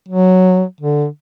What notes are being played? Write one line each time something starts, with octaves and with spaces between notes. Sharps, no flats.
F#3
D3